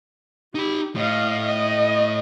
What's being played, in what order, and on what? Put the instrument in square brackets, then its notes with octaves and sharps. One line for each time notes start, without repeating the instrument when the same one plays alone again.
[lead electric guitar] D#4 B5 [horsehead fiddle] G4
[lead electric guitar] A2 [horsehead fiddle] D#5 F5
[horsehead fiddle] D#5